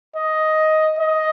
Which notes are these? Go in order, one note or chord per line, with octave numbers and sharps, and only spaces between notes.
D#5
D#5